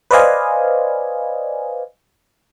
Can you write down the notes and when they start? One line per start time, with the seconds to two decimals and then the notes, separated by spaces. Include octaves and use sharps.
0.11 B4 C5 D5 D#5 F5 G#5